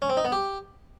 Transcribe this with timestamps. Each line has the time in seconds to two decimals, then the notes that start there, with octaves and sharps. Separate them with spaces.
0.02 C#4
0.10 C4
0.17 D#4
0.25 B3
0.32 G4